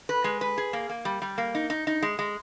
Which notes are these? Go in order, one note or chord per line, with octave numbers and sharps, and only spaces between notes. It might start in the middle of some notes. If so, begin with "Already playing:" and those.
B4
G#3
B4
G#4
A#3
A#3
G3
G3
A#3
D#4
D#4
D#4
G#3
G#3